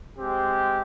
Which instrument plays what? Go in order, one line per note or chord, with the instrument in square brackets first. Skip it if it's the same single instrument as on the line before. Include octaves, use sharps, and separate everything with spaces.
[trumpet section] G#3 C4 G4